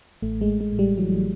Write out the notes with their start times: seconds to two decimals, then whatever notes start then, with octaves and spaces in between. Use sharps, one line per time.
0.22 A1 A3
0.41 G#3
0.48 A1
0.60 G#3
0.72 A2
0.79 G3
0.97 E3 F#3